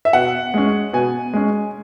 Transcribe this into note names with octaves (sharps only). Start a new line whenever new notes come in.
E5
B2 F#5
G#3 C#4
B2 G#5
G#3 C#4